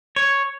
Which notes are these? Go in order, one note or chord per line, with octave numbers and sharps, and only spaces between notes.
C#5